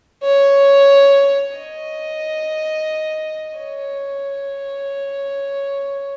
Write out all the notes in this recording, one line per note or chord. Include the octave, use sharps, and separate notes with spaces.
C#5
D#5
C#5